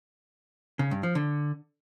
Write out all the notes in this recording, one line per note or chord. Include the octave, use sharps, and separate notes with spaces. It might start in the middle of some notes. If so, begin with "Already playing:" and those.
C#3
G2
F3
D3